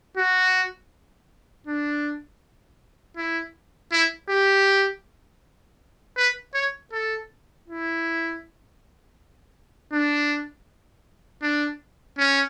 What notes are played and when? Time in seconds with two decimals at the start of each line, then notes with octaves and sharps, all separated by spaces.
0.17 F#4
1.67 D4
3.17 E4
3.92 E4
4.30 G4
6.17 B4
6.54 C#5
6.92 A4
7.68 E4
9.92 D4
11.42 D4
12.18 C#4